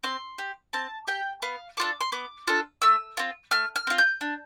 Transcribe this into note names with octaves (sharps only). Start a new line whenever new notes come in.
C4 C6
G4
C4 A5
G4 G5
B3 F5
D4 F4 A4 D6
C6
B3 D6
D4 F4 A4
A3 E6
C4 F4
A3 F6
F6
C4 F4
G6
D4